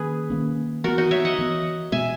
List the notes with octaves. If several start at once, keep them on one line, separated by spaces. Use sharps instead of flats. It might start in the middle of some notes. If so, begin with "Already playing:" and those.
Already playing: D#3 A#3 C#4 G#4 B4
D#3 A#3 C#4
E3 B3 F#4 A#4
D#4 F#4
C#5 E5
D#5 F#5
E3 B3
B2 G#3 B3 E5 G#5